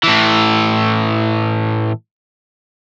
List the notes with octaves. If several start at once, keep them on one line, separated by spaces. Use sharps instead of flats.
A2 E3